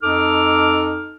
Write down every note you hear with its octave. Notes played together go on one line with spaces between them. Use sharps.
F2 D#4 A4 D6 F6